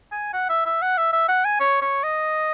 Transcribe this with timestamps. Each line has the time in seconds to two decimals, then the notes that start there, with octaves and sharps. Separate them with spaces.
0.12 G#5
0.33 F#5
0.49 E5
0.65 E5
0.82 F#5
0.97 E5
1.13 E5
1.29 F#5
1.45 G#5
1.60 C#5
1.81 C#5
2.03 D#5